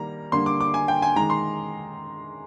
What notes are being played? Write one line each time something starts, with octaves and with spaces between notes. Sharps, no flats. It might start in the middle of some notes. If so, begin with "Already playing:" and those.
Already playing: D#3 G3 A#3 A#5
D3 G3 A#3 C6
D6
D6
G#5
G5
G#5
D#3 G#3 A#5
C6